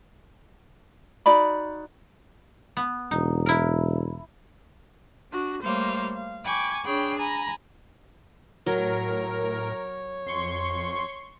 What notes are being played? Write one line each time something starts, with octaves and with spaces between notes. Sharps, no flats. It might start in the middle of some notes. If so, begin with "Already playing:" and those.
D#4 F#4 D5 B5
B3
E1 D#4
E4 A#4
D4 F#4
G3 A3 A#3 C5 C#5 F5
F5
G5 G#5 B5 C#6 D6 G#6
D4 G#4 C#5 G5 B5
G#5 A#5 B5
A2 F#3 A#4 C#5
F2 C6 C#6